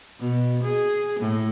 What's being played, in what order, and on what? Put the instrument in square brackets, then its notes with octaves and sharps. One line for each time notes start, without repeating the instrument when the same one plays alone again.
[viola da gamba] B2
G#4
A2